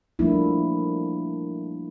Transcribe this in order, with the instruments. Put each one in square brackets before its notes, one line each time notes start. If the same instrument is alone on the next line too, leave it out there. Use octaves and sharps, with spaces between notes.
[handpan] F3 G3 A3 A#3 D4 E4